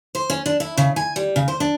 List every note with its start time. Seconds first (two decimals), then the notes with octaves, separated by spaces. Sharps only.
0.15 C5
0.30 C#4
0.46 D4
0.60 E4
0.77 C#3
0.96 G#5
1.16 G3
1.36 C#3
1.48 C5
1.60 D4